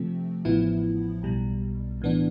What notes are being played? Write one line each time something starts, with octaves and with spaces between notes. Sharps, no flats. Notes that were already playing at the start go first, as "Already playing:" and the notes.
Already playing: C3 F3 A3 C4
A1 A2 F3 B3 E4
B1 B2 G3
A2 E3 B3 D4